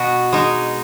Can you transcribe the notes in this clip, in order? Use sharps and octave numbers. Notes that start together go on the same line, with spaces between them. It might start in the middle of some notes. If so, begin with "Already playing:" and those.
Already playing: B2 F#4
G#3 D#4